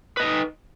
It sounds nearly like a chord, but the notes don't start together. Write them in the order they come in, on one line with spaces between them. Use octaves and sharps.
B4 D#5 D#4